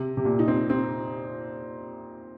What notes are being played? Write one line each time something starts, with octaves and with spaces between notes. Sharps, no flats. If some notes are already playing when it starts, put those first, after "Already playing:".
Already playing: C3
C3
A#2
D#4
C4
C4